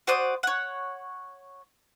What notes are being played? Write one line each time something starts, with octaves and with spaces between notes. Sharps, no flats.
F#4 C5 D5 D#6
C#5 F#5